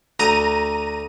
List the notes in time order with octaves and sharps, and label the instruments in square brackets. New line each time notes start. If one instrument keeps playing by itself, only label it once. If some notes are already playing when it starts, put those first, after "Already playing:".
[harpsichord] D2 [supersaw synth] A#5 D#7